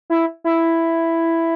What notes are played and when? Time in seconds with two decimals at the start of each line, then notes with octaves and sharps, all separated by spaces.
0.10 E4
0.44 E4